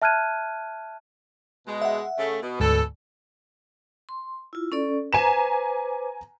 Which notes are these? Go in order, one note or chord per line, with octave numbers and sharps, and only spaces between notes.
E5 A5 F6 F#6 G#6 D#7
B2 G#3
E5 F#5
C#3 A3
B2
D2 G#2 B2 A4
C6
E4 F4
C#4 A4 D5
B4 C5 G#5 A#5 D6 E7